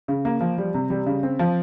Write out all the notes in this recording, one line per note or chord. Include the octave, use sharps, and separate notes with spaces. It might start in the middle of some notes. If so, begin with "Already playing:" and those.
C#3
A#3
F3
G3
C3
G3
C#3
C4
F3